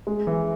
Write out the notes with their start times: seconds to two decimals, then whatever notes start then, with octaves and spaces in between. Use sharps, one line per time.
0.07 G#3
0.27 E3